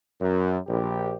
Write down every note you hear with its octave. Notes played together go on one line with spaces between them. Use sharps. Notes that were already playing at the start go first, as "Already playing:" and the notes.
F#2
A#1 G4